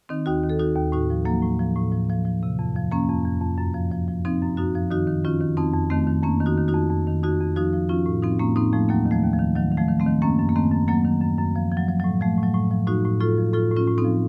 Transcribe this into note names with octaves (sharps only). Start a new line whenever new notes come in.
D#3 C4 D#4
D#2 D#4 F#4
D#3
A4
D#3 D#4 F#4
D#2
A2 D#4 F#4
F3
F3 F#3 A#3
A2
F3
A2
F3
F3
F3
C3
F2
F3
F3 A#3 C#4
F2
F2
F2
F#2
F3
F3
F3
F3 C4 D#4
F#2
F#2 D#4 F#4
F3
D#3 D#4 F#4
D#3
D#3 C#4 F4
D#3
F2 C4 D#4
F2
D#3 A3 C4
D#3
F2 A#3 C#4
D#3
D#4 F#4
D#3
D#4 F#4
F2
F2
D#3
F2 D#4 F#4
F2
F3 D#4 F#4
F3
F3 C#4 F4
A2
F3 C4 D#4
A2 A#3 C#4
A2 C4 D#4
A2 F3 A3
D#2 F#3 A#3
D#3
F3 A3
D#2
F3
D#3
D#3 F#3
D#3
F3 A3
D#3
A3 C4
D#3
F#2 A#3 C#4
F#2
A#3
D#3 A3 C4
F#2
F#2 F#3 A#3
D#3
F#2
F#2
F3
F3
F#3
F3
A2 F#3
F3 A3
A2
F#3
A2
F3
A2 D#4 F#4
A2
A2 F4 A4
F3
A2 F4 A4
A2
C#4 F4
A2
C4 D#4
F3